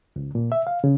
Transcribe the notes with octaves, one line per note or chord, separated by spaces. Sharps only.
C#2
A#2
E5
F5
C#3